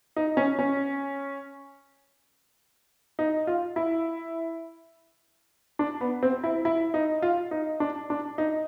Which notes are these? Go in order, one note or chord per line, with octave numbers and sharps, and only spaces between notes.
D#4
C#4
C#4
D#4
F4
E4
D4
B3
C4
E4
E4
D#4
F4
D#4
D4
D4
D#4